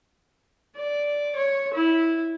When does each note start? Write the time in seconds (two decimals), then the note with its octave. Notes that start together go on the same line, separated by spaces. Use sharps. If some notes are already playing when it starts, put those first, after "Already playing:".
0.77 D5
1.36 C#5
1.74 E4